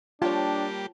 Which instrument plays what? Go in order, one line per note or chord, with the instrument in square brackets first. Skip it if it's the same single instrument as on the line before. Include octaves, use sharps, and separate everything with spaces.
[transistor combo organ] G3 A#3 G4 [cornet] D4 [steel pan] F4 [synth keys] C#5 G5 A5